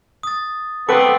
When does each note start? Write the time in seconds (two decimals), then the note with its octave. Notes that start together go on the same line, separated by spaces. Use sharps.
0.23 D#6 A6
0.89 A3 B3 C4 A4 B4 F#5 D6